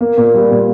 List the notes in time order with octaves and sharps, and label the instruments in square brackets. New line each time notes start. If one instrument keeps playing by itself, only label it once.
[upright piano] A#3
A#2
G3
A#2